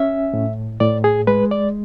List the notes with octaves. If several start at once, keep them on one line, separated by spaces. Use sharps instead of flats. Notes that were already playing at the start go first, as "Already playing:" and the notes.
Already playing: C#4 E5
A2
A2 D5
G#4
G#3 B4
D5